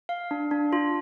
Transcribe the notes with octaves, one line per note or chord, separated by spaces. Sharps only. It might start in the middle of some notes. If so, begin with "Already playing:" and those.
F5
D4
D4
F4